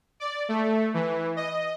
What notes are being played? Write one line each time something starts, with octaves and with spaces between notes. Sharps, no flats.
D5
A3
E3
D#5